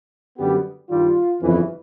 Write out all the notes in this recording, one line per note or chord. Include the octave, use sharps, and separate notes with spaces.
F#2 D3 G3 B3 G4
G2 D#3 G3 F4
G1 F2 C#3 E3